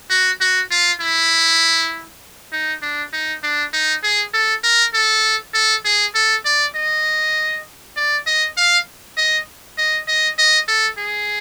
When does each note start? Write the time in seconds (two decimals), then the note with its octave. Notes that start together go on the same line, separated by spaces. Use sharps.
0.10 F#4
0.41 F#4
0.71 F4
1.01 E4
2.52 D#4
2.82 D4
3.13 D#4
3.43 D4
3.73 D#4
4.03 G#4
4.34 A4
4.64 A#4
4.94 A4
5.54 A4
5.85 G#4
6.15 A4
6.45 D5
6.76 D#5
7.96 D5
8.26 D#5
8.57 F5
9.17 D#5
9.78 D#5
10.08 D#5
10.38 D#5
10.68 A4
10.98 G#4